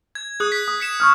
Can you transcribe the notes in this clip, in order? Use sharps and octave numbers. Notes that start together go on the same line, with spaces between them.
G#6
G#4 D#6 F#6
B6
D#6
B6 C#7 E7
C#6 D#6 F6